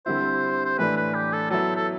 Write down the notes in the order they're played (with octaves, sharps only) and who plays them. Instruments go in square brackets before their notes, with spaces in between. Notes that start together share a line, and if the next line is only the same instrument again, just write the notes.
[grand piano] D3 G3 C4 E4 [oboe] C5
[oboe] C5
[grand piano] A2 E3 A3 D4 [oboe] B4
[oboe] B4
G4
A4
[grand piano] F#3 B3 E4 [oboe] A4
[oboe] A4